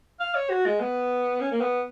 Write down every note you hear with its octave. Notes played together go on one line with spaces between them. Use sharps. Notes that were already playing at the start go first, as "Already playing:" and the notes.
F5
C#5
F#4
G#3
B3
C#4
A#3
B3